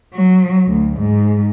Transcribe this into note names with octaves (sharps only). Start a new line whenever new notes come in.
F#3
D2
G#2